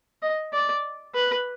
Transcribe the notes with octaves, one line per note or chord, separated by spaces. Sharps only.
D#5
D5
B4